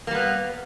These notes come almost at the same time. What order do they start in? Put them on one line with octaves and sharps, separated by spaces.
A#3 G3 B3